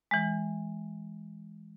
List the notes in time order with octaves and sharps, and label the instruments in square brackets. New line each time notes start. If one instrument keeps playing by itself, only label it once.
[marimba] E3 G#3